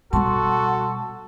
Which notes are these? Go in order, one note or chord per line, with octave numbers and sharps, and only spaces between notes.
B2 G3 F#4 A4 A5 C6